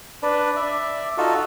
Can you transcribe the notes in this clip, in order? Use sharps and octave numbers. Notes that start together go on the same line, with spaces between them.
D4 B4
D5 E5
D#4 F4 F#4 A4